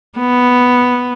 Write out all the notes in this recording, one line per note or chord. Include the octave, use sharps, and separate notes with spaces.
B3